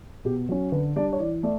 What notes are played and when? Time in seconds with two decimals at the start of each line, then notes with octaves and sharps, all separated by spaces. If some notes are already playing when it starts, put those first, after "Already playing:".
0.25 B2 G4
0.49 F#3 C#4
0.72 D3 B4
0.96 G3 D4 D5
1.13 C#5
1.19 E3 D5
1.43 A3 D5